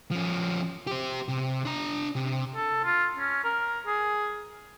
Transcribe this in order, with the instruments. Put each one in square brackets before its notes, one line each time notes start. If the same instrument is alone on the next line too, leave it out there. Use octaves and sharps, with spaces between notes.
[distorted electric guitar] F3 C#4
G4 C5
C3
D4 A#5
C3
[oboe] A4
F4
C#4
A#4
G#4